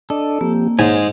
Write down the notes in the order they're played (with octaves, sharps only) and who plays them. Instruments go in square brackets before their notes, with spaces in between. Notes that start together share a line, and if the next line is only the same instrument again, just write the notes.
[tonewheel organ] D4 D5 D#5 [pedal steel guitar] A4
[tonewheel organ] F3 C4 G4 [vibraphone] A#3
[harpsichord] G#2 [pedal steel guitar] G#3 G#4 G#5 [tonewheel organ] C#5 G5 C6